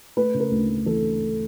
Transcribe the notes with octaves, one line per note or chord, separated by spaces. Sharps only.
A3 B4
C#3
A#4
D2
A3
E3 A4